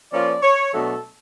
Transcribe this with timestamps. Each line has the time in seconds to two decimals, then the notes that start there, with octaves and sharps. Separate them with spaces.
0.12 F3 A#3 C#4 F4 D5
0.43 C#5
0.73 B2 F#3 A3 D4 A4